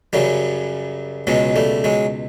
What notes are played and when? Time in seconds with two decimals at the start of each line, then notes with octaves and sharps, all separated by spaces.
0.13 F#2 C#3 F#3 G3
1.27 C#2 B2 F#3 G#3
1.56 G3 A3
1.84 F#3 G#3